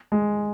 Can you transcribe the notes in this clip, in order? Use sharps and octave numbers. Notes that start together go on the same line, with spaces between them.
G#3